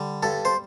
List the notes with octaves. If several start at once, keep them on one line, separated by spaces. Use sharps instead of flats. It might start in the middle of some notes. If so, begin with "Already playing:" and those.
Already playing: D3 G3
G2 A4
C5